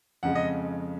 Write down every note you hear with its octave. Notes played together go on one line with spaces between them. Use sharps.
F2 C#3 G#3 F#5
D#5